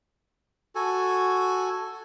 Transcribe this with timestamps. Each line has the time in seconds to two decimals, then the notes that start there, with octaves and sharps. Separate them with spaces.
0.75 F#4 A4 G#5